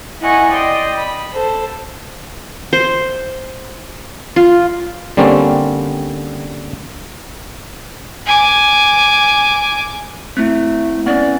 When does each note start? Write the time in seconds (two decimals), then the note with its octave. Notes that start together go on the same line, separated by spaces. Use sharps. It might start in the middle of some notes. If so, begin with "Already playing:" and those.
0.21 E4 D#5 F#5 G#5 C#6
0.50 D5 D#5 G5 C6
0.97 B5
1.31 A4 C5
2.73 C5
4.36 F4
5.17 D3 G3 A#3 C4 C#4
8.26 G#5 D6
10.37 A3 C4 E4
11.06 B3 C#4 D5